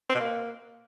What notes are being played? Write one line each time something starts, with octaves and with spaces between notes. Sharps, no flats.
C4
B2
A#3